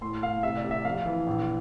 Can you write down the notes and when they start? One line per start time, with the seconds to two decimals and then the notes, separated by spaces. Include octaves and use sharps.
0.01 A2 C6
0.22 A2 F5
0.43 C3 E5
0.57 D5
0.65 C3
0.71 E5
0.85 F2 F5
1.06 E3
1.26 A#1